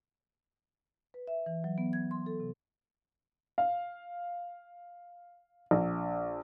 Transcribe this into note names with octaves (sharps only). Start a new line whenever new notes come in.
B4
E5
E3
F#3
B3
G#6
C6
A4
C3
F5
A#1